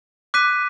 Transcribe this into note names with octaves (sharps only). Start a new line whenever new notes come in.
D6 F#6 B6 D#7